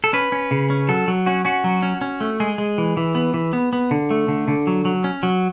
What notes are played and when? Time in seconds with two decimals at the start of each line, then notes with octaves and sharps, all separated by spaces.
0.04 A4
0.13 C#4 B4
0.32 C#4
0.51 C#3
0.70 C#4
0.89 F#3 A4
1.08 F#3
1.26 C#4 F#4
1.45 C#4 F#4
1.64 F#3
1.83 C#4
2.01 C#4
2.21 A3
2.40 G#3 G#4
2.58 G#3
2.78 E3
2.97 E3
3.15 B3
3.34 E3
3.53 B3
3.73 B3
3.91 D3
4.11 A3
4.28 D3
4.48 D3
4.67 F#3
4.85 F#3
5.04 C#4
5.23 F#3